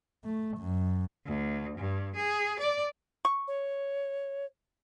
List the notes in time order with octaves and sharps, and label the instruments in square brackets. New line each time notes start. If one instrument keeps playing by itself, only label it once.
[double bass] A3
F#2
[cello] D2
G2
G#4
D5
[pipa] C#6
[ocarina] C#5